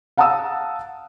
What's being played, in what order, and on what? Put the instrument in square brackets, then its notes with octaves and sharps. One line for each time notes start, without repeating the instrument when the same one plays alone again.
[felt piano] F5 F#5 A5 A#5 D#6 E6